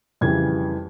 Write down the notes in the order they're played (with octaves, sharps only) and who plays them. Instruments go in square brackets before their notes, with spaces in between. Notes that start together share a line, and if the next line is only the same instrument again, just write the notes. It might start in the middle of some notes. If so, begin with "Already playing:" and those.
[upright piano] F2 C#3 E3 G3 G#6